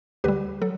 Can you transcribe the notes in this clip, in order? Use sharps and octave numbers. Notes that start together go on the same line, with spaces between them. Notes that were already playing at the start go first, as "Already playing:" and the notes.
D2 D3 G3 G4 B4
F#3 A4